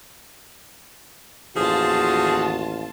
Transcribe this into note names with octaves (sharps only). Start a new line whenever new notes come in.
A1 D#2 F3 F4 F#4 G#4 A5